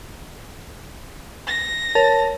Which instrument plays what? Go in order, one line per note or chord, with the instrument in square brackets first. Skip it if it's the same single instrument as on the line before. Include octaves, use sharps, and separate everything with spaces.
[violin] A#6
[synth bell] A#4 A5 A6 [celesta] C#5